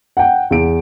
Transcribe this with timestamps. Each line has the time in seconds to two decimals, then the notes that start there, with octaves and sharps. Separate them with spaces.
0.17 F#5 G5
0.51 E2 D7